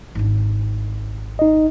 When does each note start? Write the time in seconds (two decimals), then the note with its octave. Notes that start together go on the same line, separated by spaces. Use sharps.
0.15 G#1 D4
1.39 D#4 D#5